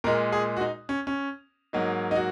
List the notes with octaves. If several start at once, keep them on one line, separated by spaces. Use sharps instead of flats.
A#2 G#3 A#4
G#4
F#4
D#4
C#4
C#4
G#2 F#3 A#3 D#4
D#4
F#4